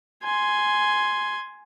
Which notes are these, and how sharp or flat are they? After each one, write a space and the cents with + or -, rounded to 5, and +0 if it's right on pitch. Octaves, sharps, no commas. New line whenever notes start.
G#5 +5 C6 +0